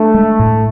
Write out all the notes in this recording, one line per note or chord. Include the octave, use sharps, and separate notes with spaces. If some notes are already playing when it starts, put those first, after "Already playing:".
Already playing: A3 D4
G#3
A2